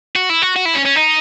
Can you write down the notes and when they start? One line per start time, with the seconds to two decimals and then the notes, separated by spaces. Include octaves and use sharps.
0.16 F#4
0.30 E4
0.42 F#4
0.56 F#4
0.66 E4
0.75 C#4
0.86 C#4
0.96 D#4